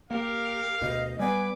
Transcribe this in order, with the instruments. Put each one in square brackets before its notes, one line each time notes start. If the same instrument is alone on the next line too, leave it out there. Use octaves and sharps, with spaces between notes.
[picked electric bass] A#3 [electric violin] G4 A#4 [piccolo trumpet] F5
[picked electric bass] D2 B2 [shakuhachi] D#5
[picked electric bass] G3 B3 [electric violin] B4 [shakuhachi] G#5 [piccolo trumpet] D6